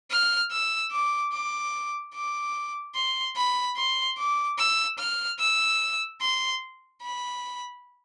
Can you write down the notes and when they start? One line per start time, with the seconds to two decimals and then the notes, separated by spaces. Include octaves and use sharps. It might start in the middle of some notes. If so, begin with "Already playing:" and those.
0.11 F6
0.51 E6
0.92 D6
1.32 D6
2.14 D6
2.95 C6
3.36 B5
3.76 C6
4.18 D6
4.59 E6
4.99 F6
5.39 E6
6.21 C6
7.02 B5